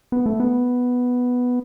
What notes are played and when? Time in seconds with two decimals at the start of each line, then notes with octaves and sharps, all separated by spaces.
0.12 B3
0.26 A3
0.40 B3